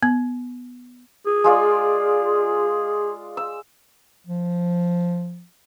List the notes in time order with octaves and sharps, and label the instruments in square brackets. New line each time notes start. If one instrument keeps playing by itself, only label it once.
[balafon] B3
[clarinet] G#4
[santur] G#3 F4 D5
E6
[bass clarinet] F3